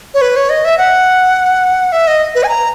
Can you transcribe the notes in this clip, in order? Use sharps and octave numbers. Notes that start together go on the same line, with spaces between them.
C#5
B4
C#5
D#5
E5
F#5
E5
D#5
B4
G#5
A#5